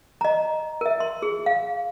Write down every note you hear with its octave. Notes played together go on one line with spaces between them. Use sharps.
D#5 A#5
A#4 E5
C6
G#4
F5